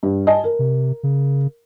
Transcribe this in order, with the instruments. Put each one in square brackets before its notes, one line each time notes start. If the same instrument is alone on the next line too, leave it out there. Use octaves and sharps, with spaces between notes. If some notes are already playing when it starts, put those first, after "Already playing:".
[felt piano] G2
D#5 G#5 A5
A#4
[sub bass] C3
C#3